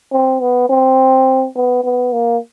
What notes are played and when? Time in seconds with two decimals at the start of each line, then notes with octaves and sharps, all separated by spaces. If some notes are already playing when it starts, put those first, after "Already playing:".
0.12 C4
0.41 B3
0.69 C4
1.56 B3
1.84 B3
2.13 A#3